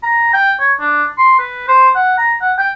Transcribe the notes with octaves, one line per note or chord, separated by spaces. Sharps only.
A#5
G5
C#5
D4
C6
B4
C5
F#5
A#5
F#5
G5